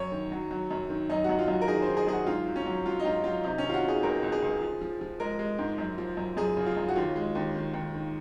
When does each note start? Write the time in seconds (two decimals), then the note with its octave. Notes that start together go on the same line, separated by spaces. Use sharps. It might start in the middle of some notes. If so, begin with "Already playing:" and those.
Already playing: F#2 C#5
0.12 D#3
0.32 F#3
0.51 F#3
0.71 F#2
0.89 D#3
1.10 F#2 D#4
1.24 F#2 F#4
1.39 F4
1.48 F#2
1.53 F#4
1.62 A#4
1.68 D#3 G#4
1.82 C5
1.87 D#3
1.97 G#4
2.07 F#2 G#4
2.12 F#4
2.27 G#2 F4
2.46 F#3
2.56 C#4
2.66 F#3
2.86 F#3 F4
3.00 D#4
3.04 G#2 F4
3.24 F#3 F4
3.43 C3 D#4
3.58 D#3 C#4
3.69 F4
3.74 F#4
3.83 D#3
3.88 G#4
4.03 C#2 A#4
4.23 C#2
4.32 G#4
4.42 C#2
4.62 F3
4.81 F3
5.01 F3
5.20 G#3 A#4
5.39 G#3
5.59 G#2
5.78 F#2
5.98 F3
6.17 F#2
6.37 F#2 G#4
6.57 C#3
6.66 F4
6.77 F#2
6.88 F#4
6.96 D#2 F4
7.16 G#3
7.35 D#2
7.54 D#3
7.74 D#2
7.94 D#3